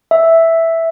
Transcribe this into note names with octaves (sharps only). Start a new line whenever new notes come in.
E5